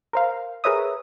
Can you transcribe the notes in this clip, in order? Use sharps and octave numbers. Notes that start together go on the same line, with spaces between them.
A#4 C5 F5
G#4 A#4 B4 C#5 E5 D#6